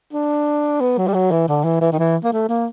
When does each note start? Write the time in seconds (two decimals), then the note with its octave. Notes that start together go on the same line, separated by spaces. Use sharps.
0.13 D4
0.80 B3
0.98 F#3
1.07 G3
1.14 F#3
1.31 E3
1.48 D3
1.64 E3
1.81 E3
1.92 D#3
1.98 E3
2.23 A#3
2.32 A3
2.49 A#3